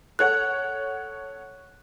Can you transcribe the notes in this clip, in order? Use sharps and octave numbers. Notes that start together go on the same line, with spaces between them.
A4 C#5 F#5 F#6